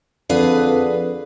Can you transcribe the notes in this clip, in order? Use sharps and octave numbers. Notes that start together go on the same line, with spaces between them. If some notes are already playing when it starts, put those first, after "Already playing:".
F2 D3 G#4 B4 F5